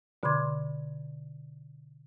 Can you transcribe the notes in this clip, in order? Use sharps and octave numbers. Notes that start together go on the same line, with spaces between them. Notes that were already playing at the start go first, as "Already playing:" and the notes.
B2 D3 B5 C6 D6 G#6